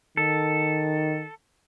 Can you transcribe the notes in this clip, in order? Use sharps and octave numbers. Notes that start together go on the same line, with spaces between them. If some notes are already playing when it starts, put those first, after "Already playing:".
D#3 A4